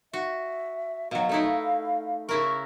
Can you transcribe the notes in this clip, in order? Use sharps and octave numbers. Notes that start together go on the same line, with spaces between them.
F#4 E5
B2 F#3 F5
A3 D#4 E4
C#3 E4 A#4 C#6